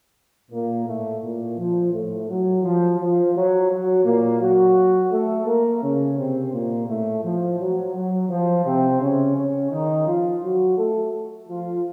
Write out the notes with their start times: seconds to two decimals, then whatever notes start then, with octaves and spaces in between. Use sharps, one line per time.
0.51 A#2 A#3
0.86 A2 A3
1.22 A#2 A#3
1.57 F3
1.93 A2 A3
2.29 F#3
2.63 F3
2.99 F3
3.35 F#3
3.70 F#3
4.05 A#2 A#3
4.41 F#3 F#4
5.11 A3 A4
5.46 A#3 A#4
5.82 C#3 C#4
6.17 C3 C4
6.52 A#2 A#3
6.87 A2 A3
7.23 F3
7.59 F#3
7.94 F#3
8.29 F3
8.64 C3 C4
9.00 C#3 C#4
9.35 C#3 C#4
9.70 D#3 D#4
10.06 F3 F4
10.42 F#3 F#4
10.76 A3 A4
11.47 F3 F4